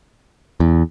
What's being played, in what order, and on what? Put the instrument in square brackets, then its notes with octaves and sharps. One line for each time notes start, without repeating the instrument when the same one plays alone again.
[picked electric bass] E2